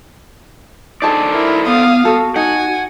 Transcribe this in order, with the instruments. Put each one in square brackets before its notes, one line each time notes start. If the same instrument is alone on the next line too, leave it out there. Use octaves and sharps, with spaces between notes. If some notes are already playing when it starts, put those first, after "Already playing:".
[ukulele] D#4 G#4 A5 [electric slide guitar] A4 C5 D5
[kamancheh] E4 A#4
[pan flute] B3 [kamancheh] F5 D#6
[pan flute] F#4 [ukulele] A4
[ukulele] D#4 [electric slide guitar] F#5 [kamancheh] G#5